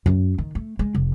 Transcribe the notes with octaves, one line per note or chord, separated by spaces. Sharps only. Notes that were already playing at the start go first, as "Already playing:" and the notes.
F#2
D#3
A3
G#3
F1